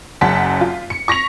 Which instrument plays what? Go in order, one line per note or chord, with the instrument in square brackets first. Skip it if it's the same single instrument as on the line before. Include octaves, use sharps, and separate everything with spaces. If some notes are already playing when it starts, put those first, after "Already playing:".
[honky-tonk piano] F#1 F#2 F#5 A5 B6
F4
C#7
C#6 A#6 B6 F7